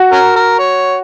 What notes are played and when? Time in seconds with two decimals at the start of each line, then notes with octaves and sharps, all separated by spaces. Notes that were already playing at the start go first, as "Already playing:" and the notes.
Already playing: F#4
0.12 C#4 A#4
0.36 A#4
0.59 C#5